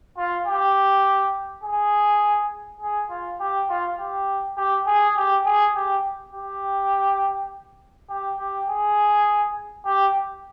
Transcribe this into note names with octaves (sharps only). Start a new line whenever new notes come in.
F4
G4
G#4
G#4
F4
G4
F4
G4
G4
G#4
G4
G#4
G4
G4
G4
G4
G#4
G4